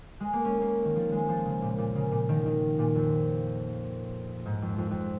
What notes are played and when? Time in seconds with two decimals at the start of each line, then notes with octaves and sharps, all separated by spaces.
0.20 G#3
0.33 A#3
0.45 C#4
0.62 A#3
0.85 D#3
0.96 F3
1.12 G#3
1.29 F3
1.45 C#3
1.62 A#2
1.78 A#2
1.95 C#3
2.12 A#2
2.29 D#3
2.46 D#3
2.79 A#2
2.95 F2
4.46 G#2
4.62 F2
4.78 F2
4.91 F2